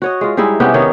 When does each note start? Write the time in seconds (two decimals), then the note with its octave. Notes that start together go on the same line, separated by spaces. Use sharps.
0.02 F#4 C#5 D#5
0.21 G#3 F4
0.37 G3 G#3 D#4 E4
0.60 C3 B3 C#4 G4
0.74 D#3 D#4 C#5